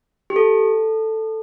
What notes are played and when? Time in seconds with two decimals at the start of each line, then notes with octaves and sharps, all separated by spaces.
0.30 G4
0.36 A4